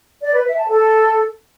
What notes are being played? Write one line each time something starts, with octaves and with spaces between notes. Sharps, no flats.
D5
B4
E5
A5
A4